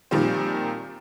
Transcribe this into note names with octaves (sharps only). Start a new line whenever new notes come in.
A#2 D#3 F3 G3 C4